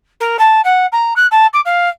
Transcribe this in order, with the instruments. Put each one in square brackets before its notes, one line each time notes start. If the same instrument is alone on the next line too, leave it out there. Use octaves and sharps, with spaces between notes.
[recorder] A#4
A5
F#5
A#5
F#6
A5
D6
F5